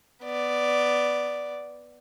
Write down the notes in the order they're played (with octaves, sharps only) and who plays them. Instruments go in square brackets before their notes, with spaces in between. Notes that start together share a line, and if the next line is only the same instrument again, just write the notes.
[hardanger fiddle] B3 D5